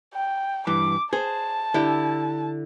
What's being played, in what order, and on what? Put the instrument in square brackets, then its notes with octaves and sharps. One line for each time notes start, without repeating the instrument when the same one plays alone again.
[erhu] G5
[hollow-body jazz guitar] G2 E3 [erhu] D6
[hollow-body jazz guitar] G#4 [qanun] C5 [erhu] A5
[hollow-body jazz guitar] D3 G4 [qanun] E4